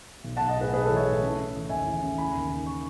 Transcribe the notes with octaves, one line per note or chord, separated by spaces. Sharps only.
B1
B1 F#5 A5
D#5 F#5
A2 G#4 B4
B1 G#4 B4
E3 A4 C#5
C#5 E5
A2
C#3
C#3
E3
D#2 E5 G#5
E3
C#3
E3 G#5 B5
D#2
D#2
C#6